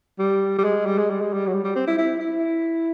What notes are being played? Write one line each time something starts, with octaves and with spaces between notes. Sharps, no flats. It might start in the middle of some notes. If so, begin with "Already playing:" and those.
G3
G3
G#3
G3
G#3
G3
G#3
G3
F#3
G3
G3
C4
E4
E4
E4